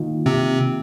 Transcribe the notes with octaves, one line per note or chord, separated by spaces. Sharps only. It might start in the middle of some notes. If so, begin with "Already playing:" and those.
Already playing: D#3 A#3 F4
C3 C4